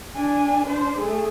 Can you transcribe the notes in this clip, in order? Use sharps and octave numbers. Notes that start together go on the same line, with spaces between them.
D4 G#5
D4 C5
A3 G#4